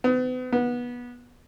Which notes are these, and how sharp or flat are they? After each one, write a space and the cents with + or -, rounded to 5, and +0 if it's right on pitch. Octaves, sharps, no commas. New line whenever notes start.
B3 +40
B3 -20